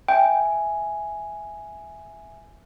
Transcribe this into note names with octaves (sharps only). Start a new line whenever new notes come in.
E5 G5 G#5